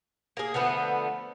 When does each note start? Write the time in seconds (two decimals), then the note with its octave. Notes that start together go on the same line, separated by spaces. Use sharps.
0.37 A#3 G#4
0.54 D3 F3 A3 B3